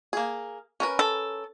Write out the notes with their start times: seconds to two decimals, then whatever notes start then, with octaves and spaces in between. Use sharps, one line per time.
0.13 A#3 G#4
0.80 C#4 A#4 B4
0.99 A4